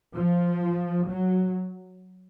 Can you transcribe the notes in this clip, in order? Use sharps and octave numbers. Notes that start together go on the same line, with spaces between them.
F3
F#3